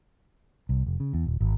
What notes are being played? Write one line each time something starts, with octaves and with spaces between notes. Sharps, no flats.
C2
F1
C#3
E2
D#1
G#1